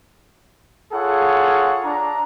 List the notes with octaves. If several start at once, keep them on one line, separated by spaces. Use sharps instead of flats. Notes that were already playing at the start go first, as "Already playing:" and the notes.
F4 G#4 A4 C#5 F#5
D4 A#5